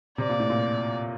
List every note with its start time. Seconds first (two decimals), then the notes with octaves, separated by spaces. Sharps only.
0.18 C3 D5
0.29 A#2
0.40 A2
0.50 A#2